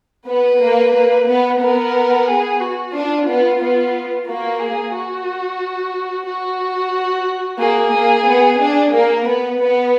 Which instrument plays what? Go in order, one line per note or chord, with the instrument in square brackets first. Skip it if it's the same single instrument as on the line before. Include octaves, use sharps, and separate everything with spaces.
[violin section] B3 [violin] B4
[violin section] A#3
A#3
B3
[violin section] B3 [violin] A#4
[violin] G#4
F#4
[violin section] D4 [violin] F4
[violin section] B3
B3
[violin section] A#3 [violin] F#4
[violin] G#4
F#4
F#4
[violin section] A#3 [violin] G#4
[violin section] A#3
B3
D4
[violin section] A#3 [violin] A#4
[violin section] B3 [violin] B4
[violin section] B3